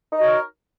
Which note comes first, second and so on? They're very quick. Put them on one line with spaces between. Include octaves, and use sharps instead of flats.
D#4 D#5 F#4 C#5 A#4